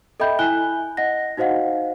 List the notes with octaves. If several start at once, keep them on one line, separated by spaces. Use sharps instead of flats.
A4 D#5 E5 G5 B5 G6
E4 G#5 F#6 G7
D#5 F#5 A#6
D#4 F#4 C5 D#5 F5 F#5